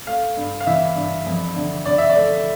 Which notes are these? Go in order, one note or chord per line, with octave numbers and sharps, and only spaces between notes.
A3 F5
G2
F5
E3 E5
G2
F2
D3
D3 D5
E5
D5
A3